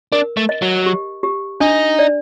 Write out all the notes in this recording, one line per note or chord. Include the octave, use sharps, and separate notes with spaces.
D4 A#4
A3
D#5
F#3
G4
G4
D4 D#4
D5